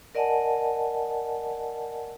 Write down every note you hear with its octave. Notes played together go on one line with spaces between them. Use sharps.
A#4 D5 D#5 F#5 G#5 A5